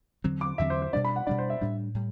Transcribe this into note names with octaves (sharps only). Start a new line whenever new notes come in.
E2 D3 F#3 C4
D6
E2 D3 F#3 C4 E5
C5
C5
B2 G3 D4 D5
B5
F#5
B2 G3 D4 D5
C5
E5
A2 G3 D4
A2 G3